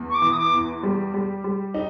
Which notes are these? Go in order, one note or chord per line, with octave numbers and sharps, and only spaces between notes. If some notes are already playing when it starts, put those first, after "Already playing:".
Already playing: E2
C#6
D6
E3
D#6
D6
E2
G3
G3
G3
D#4